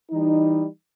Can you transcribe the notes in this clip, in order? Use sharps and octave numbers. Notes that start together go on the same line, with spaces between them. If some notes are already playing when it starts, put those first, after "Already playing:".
E3 G3 D#4